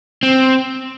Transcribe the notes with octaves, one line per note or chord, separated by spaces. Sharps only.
C4